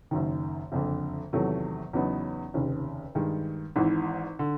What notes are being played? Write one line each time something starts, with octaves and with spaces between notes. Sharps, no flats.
F#1 F#2 D#3
F#1 F2 D3
E2 C3 D#3 F#3 A3
E2 C#3 F#3 B3 D#4
F1 D#2 C#3
G2 D#3 G#3
G#1 G#2 E3
D3